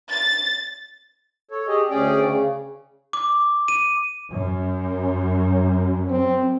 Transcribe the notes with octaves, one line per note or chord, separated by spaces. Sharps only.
A6
A4 C#5
G4 G#4 D#5
D2 C#4 G#4 D5 G5
C#3
D6
D#7
F#2
C4